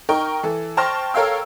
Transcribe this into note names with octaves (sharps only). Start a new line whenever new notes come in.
D#4 A#4 G5 C#6
E3 A4
C5 G5 A5 C#6 F6 A#6
A4 A#4 C#5 F5 G5 E6